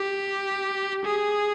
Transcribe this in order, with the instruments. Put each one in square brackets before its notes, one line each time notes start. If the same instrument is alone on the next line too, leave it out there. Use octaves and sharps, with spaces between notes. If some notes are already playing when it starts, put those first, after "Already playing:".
Already playing: [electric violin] G4
G#4